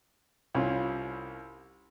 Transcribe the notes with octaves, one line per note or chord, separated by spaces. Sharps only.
C2 C#4 F4